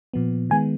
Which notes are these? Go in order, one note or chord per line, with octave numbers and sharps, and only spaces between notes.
A#2 F3 B3
D#3 G#3 B3 G#5